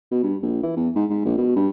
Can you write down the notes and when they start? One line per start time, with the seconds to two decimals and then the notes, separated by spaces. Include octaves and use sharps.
0.11 B2
0.23 G2
0.43 A#1
0.63 E3
0.77 E2
0.95 G#2
1.10 G#2
1.24 A#1
1.37 B2
1.56 G2